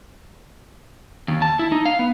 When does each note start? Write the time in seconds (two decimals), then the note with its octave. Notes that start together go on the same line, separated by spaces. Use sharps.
1.28 D#2
1.42 A5
1.59 E4
1.72 D#4
1.85 F5
1.99 B3